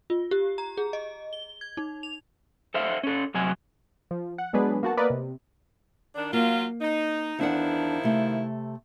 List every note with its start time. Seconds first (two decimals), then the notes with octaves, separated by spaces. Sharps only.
0.10 F4
0.31 G4
0.58 A#5
0.77 G#4
0.93 D#5
1.33 G7
1.61 G#6
1.77 D#4
2.03 F7
2.74 A4 C5 E5 F5
3.03 C#4 A4
3.34 F#2 C3 F#3 G#5
4.11 F3
4.38 F#5
4.53 F#3 G#3 B3 D4 G#4 B4
4.83 A#3 B3 F#4 F#5 A5
4.97 A#3 B3 A#4 B4 D5 D#5
5.10 C3
6.15 D#3 D4
6.33 F#3 A#3 F4
6.81 D#4
7.39 E2 D#3 F3 D4 E4 F#5
8.03 C3 A3